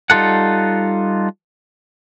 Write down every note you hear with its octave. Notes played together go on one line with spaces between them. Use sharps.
G3 D#4 F4 A4 F#5